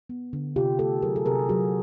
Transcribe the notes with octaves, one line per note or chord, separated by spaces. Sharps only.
B3
D3
C3 F4 G4
A3 G4 A4
F#3 G#4 A#4
A4
C3 G#4 A#4
F#3 F#4 G#4